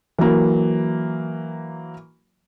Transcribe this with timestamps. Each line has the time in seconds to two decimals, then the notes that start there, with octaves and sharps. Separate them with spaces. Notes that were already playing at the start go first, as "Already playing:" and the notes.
0.18 E3 F#3 A#3